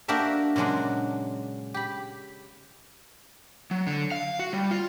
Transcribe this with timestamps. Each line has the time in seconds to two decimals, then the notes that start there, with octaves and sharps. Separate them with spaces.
0.08 A#3 D4 F#4 G4 A#4 E5
0.56 A#2 C#3 F#3 G#3 D4
1.74 G4 B5
3.71 F#3
3.87 D3
4.12 F5
4.39 F#4
4.53 G3
4.71 F4